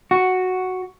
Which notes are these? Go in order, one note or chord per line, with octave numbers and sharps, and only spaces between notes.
F#4